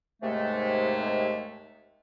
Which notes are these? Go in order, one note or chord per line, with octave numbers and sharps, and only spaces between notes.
D#2 G#2 C3 G#3 A3